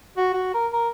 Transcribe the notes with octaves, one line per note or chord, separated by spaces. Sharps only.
F#4
F#4
A#4
A#4